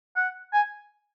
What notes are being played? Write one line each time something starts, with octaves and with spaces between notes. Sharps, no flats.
F#5
G#5